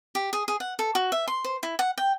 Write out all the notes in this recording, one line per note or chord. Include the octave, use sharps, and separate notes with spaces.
G4
G#4
G#4
F#5
A4
F#4
E5
C6
C5
E4
F#5
G5